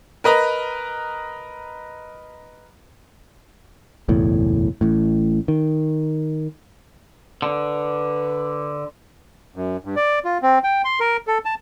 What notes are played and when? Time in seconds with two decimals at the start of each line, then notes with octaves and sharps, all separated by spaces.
0.24 A#4 B4 D#5 A#5
4.09 F#1 B1 E2 A2
4.81 A1 A2
5.48 D#3
7.42 D3 B4
9.56 F#2
9.85 G2
9.96 D5
10.25 F4
10.42 C4
10.64 G5
10.84 C6
11.00 A#4
11.27 A4
11.45 A5